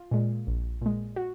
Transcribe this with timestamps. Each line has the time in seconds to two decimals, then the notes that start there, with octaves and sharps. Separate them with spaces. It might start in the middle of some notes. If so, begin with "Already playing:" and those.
Already playing: F4
0.11 A#2 G#3
0.47 A#1
0.82 A#2 G#3
1.16 F#4